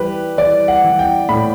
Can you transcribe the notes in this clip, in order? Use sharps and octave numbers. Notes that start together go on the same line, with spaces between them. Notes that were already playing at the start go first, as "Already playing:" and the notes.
Already playing: E3 G3 G4 B4
E3 D5
F#5
E3
G5
A2 B5